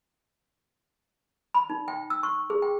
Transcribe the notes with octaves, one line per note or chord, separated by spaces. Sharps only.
B5
D#4
G5
E6
C#6
G#4
G5